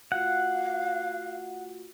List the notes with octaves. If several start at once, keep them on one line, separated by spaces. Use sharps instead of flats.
A3 F4 F#4 F5 F#5